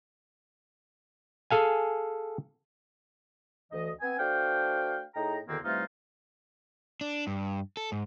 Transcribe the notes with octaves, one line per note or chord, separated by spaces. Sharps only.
G#4 A4 F5 G#5
D2 E3 D#5
B3 C4 G#5
A3 D4 F#4 C5 F5 G5
A2 D#4 G#4 G5 A#5
E2 B2 D3 D#3 A#3 C4
C3 E3 G3 A3 D#4 F4
D4
G2
A4
G#2